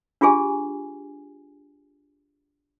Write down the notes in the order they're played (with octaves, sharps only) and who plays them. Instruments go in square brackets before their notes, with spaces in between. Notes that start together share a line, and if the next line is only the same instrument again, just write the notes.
[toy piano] D4 F4 G4 G#4 G#5